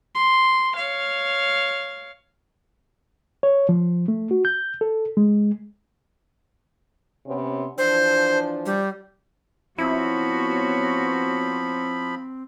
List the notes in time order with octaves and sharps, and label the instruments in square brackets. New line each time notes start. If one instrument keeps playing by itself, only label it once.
[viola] C6
C#5 F5
[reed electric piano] C#5
F3
A3
F#4
G6
A4
G#3
[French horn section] C3 B3 C#4
[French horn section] E3 F3 D4 [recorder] C5
[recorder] G3
[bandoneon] F3 B5 [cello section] B3 F#4 C#5 [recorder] C4 [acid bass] E4